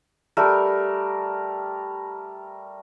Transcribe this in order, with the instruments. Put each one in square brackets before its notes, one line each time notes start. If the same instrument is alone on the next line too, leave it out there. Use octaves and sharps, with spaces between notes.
[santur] G3 A3 A#4